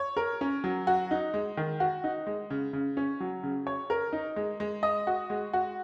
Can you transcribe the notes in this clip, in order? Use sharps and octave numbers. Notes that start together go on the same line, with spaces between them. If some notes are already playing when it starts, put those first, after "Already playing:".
Already playing: C#5
A#4
C#4
F#3
F#4
D#4
G#3
D#3
F#4
D#4
G#3
C#3
C#3
C#4
F#3
C#3
C#5
A#4
D#4
G#3
G#3
D#5
F#4
G#3
F#4